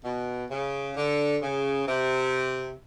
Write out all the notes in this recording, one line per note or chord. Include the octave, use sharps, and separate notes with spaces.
B2
C#3
D3
C#3
C3